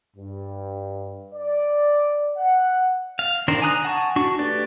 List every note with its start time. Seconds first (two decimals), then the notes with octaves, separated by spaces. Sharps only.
0.17 G2
1.34 D5
2.37 F#5
3.19 F5
3.48 D#3 D4 A#4 C5
3.62 G#5 A#5 D#6 F#6
3.85 F#5 G#5 A5 C#6
4.16 D4 F#4 C#6
4.39 A3 G4 B4 D5